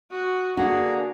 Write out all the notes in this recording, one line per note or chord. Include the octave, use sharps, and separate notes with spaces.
F#4 D#6
D3 A#3 D4 F#4 G#4 A#5